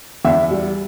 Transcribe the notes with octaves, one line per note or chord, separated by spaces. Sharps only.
E2 E5
G3